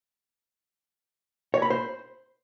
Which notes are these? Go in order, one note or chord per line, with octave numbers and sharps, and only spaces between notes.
C#5
B5
C5